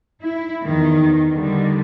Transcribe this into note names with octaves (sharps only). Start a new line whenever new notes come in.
E4
E2 D#3
D3 D#3 G3